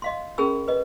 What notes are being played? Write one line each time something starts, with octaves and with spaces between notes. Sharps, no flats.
D#5 F5 C6
C#4 G#4 A#4 G#5 B5 E6
B4 D#5